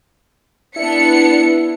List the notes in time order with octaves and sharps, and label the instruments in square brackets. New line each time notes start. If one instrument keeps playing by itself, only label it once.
[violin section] B3 D4 C#7 [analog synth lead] E4